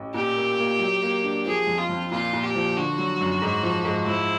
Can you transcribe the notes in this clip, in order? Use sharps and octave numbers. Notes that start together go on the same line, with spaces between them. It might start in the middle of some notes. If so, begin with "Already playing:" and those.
Already playing: A1
A#2 G4
A#3
A#3
F#3
A#3
D4
F3 G#4
F2
F4
F2
A#2 F4
A#2
G4
F3
D3 F#4
F#3
F#2
G#2
F3
G#2
F3 E4